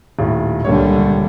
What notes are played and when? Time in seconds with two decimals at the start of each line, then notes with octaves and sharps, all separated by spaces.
0.19 D#1 A2
0.64 D#1 C#2 D3 G3 A#3 C#5